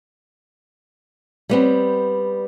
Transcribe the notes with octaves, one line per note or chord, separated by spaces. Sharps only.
G3 B3 C4